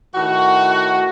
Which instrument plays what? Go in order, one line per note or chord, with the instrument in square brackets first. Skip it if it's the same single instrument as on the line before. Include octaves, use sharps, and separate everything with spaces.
[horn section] A2 D#3 F#4